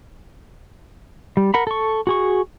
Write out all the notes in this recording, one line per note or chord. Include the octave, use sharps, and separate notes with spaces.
G3
A#4 F#5 B5
A4 C#6
F#4 G#4 C#6